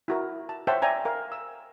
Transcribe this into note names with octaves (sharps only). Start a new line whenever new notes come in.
E4 F#4 A#4
A5
C5 C#5 E5 F#5 G5 A5
D5 E5 G5 G#5 A#5
A#4 F5
E6